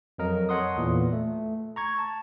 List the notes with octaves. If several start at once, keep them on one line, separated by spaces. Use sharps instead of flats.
F2 F#3 A#4 D#5
A4 C#5 D#5 F#5 C6 D#6
E2 A#2 E3
A3
A#5 C#6 G#6
A5